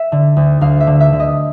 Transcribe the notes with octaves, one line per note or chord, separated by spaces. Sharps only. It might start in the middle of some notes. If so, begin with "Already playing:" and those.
Already playing: E5
D3
D2
D2 F5
E5
D3
E5
D3
D#5